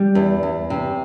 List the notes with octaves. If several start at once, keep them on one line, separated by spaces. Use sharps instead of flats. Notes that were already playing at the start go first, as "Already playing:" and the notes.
Already playing: G3
E2
E2
C3